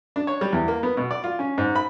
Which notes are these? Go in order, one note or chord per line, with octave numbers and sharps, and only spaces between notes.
D4
C#5
G3
E2
A#3
B3
B2
D5
F4
C#4
G#2
B5